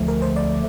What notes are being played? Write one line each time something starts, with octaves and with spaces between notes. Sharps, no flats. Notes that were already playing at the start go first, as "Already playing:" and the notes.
Already playing: D2 D3 F3 A3
A#4
C5
D5